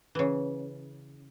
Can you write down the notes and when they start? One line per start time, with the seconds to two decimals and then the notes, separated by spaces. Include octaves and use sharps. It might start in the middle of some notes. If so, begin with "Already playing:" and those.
0.15 C#3 E3